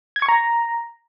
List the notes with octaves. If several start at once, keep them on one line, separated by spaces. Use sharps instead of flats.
G#6
C#6
A#5